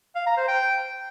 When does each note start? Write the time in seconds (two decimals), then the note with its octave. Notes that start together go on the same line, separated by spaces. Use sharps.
0.16 F5
0.26 A#5
0.37 C5
0.48 G5